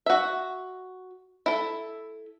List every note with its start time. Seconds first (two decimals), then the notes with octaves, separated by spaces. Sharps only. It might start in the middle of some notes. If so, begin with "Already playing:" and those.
0.06 F#4 E5
1.46 E4 A4